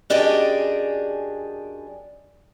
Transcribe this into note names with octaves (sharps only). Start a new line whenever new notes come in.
F#2 D4 G4 G#4 D#5